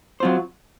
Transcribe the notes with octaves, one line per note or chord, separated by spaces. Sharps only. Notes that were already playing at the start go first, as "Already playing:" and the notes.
F#3 C4 F4 C5